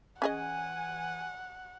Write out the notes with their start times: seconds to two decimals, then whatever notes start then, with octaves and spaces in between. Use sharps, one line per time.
0.22 E3 C#4 G#4 D#5 F#5 G#5